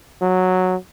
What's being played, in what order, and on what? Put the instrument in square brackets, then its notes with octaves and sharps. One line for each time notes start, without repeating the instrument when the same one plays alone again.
[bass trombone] F#3